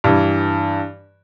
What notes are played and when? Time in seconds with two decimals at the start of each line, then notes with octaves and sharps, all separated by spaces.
0.04 G2 E3